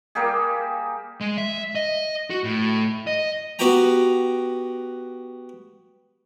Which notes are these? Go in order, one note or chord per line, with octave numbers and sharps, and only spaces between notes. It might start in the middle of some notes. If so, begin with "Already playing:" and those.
G3 A#3 G4 G#4
G#3
E5
D#5
F#4
A2
D#5
B3 F#4 G4 G5 A#5